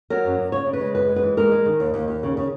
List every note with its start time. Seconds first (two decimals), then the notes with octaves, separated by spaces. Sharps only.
0.10 F#3 A#4
0.25 F#2
0.38 F#2
0.52 C#3 C#5
0.66 C#3
0.73 B4
0.81 G#3
0.95 F#2 B4
1.09 G#3
1.16 B4
1.23 E3
1.37 G#3 A#4
1.52 G#3
1.66 D#3
1.80 D#2
1.94 D#2
2.08 D#2
2.23 C#3
2.37 C#3